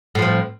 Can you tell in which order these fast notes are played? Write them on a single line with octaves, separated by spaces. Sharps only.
A2 F3 C4